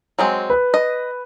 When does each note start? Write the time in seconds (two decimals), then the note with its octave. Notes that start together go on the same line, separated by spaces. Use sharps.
0.19 F#3 G#3 C4
0.50 B4
0.74 D#5